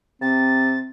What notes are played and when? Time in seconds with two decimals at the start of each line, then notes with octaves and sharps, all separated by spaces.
0.22 C3 C4 A6